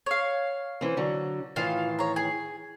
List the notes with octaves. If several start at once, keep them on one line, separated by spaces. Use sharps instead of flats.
C#5 F5
E3 C4
D3 F#3
A2 D#3 E3 F4
C#5 A#5
G#4